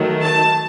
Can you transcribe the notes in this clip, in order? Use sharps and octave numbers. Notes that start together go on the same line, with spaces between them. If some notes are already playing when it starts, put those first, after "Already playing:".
Already playing: D#3 F#3 A3
A5